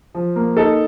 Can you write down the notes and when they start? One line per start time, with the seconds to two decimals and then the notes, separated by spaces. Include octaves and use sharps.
0.15 F3
0.36 A#3
0.57 D#4 A4